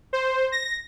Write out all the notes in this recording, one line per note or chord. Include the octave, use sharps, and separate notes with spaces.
C5
A#6